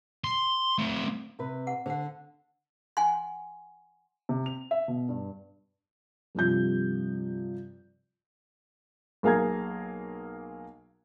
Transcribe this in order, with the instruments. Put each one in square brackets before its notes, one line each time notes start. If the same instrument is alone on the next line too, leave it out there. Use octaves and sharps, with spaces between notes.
[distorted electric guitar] C6
A3 C4
[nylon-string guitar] C3 B4
[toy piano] F#5
[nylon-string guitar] D3 [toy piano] C5 F#5
[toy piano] F#5 G#5 C6
[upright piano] C3
F7
E5
B2
G2
[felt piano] G2 C3 F3 G6
[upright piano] B1 A#3 G#4 F5 A#5 G#6